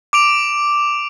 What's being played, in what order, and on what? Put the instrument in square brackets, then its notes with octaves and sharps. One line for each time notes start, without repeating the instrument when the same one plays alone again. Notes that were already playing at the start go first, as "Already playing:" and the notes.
[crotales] D6 D7 F7